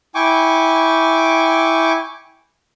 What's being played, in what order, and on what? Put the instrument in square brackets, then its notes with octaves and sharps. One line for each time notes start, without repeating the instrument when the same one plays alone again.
[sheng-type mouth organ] E4 G5 G#5 C#6 D6